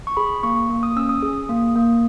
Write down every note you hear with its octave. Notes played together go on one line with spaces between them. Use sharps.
C#6
G#4 B5
A#3 C#6
A#3
D#6
C#4 E6
D#6
G#4
A#3
A#3